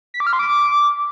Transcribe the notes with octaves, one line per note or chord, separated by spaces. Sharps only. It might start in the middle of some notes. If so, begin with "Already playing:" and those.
B6
D6
F6
C6
D6